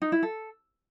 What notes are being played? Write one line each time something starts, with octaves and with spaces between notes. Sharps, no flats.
D#4
E4
A4